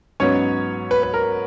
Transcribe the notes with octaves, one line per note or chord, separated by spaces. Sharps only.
G#2 F#3 B3 C#4 C#5
B4
B4
A#4